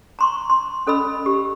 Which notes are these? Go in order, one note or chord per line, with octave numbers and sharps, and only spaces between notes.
A#5 C6 C#6
C6
C#4 A4 D#5 B5 E6
G4